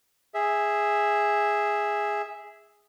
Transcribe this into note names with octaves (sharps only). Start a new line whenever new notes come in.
G#4 E5